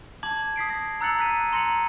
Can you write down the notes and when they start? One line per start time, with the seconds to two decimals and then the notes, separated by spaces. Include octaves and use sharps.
0.23 A5 D6 G#6 F#7
0.56 D#6 B6 C7 D7
0.70 A#6
1.01 A#5 E6 F#6 A6 C#7 F#7
1.19 F#6 B6 D#7
1.52 A#5 C6 A#6 C#7 F#7